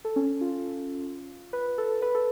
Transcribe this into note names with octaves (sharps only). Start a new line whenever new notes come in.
A4
C#4
F4
B4
A4
B4
A4